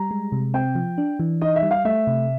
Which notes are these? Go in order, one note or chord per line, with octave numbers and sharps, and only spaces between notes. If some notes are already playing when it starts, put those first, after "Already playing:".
Already playing: G3 A#5
G#3
C3
C4 G5
F3
D4
E3
D#4 D#5
E5
G3
F5
A3 E5
C3